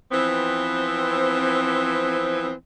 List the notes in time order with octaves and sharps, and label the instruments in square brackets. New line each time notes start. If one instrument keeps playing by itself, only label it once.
[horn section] E3 F3 B3 C4